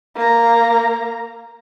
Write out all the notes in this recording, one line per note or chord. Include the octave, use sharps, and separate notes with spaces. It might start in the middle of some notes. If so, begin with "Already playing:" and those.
A#3 A#5